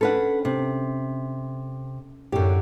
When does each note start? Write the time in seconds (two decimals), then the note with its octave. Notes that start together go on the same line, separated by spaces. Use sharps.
0.01 C#4 D4 A4 B4 F#5
0.45 C3
2.32 F#2 A2 D3 G4